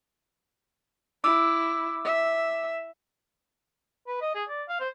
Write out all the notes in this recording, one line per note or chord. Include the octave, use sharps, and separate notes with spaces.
E4 D6 E6
E5
B4
D#5
G#4
D5
F5
C5